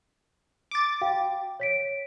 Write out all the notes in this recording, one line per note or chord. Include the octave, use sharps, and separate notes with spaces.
D6 A6
F#4 F5 G5
C#5 B6 D7